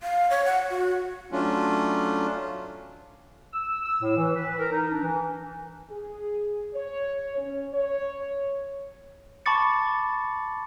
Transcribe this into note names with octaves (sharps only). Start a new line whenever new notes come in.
F5
C#5
F#5
F#4
F#3 A3 C#4 D4 F4
E6
E6
A2
E3
B4
A#4
D#4
D4
E3
G#4
C#5
C#4
C#5
A5 B5 C#6 D6 A6 C#7